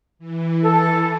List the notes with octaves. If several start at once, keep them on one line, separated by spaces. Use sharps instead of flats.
E3
A4